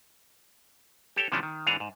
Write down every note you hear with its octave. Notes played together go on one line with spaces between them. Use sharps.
G4 A4 C#5 G5
C3 E3 F3 A3 C#4 D4
D#3
G#2 E3 D4 G#4 C#5 A#5
G#2